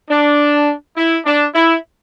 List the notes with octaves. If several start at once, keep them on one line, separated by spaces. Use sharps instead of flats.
D4
E4
D4
E4